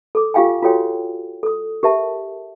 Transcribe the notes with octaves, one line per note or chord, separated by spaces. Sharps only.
A4 D6
F4 G4 F5 G5 G#5
F4 F#4 A4 C#5 G5
A4 D#6
G4 A#4 E5 A5